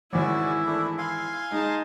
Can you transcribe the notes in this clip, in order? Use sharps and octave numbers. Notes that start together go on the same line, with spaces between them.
G#1 E2 C#4 E4 F#4 D5
A3 D4
F5 G#5 C6
G#3 D#4 A5